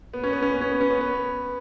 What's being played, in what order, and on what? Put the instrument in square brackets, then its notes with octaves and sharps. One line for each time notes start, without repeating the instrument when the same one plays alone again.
[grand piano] B3
C#4
B3
C#4
B3
C#4
B3
C#4
B3
B3